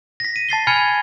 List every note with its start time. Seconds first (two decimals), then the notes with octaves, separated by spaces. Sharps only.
0.20 A#6 B6
0.36 D#7
0.49 A5 A6 C7 G7
0.67 G#5 B5 F6 G#6 C#7 G7